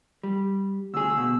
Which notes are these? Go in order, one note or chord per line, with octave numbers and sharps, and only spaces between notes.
G3
D2 G#4 E6
B2